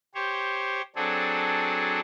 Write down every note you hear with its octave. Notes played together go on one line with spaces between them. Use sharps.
G4 C5 C#5
F#3 C4 D4 G#4 A4